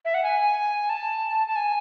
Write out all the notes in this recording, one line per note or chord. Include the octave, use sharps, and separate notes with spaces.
E5
F#5
G#5
A5
A5
G#5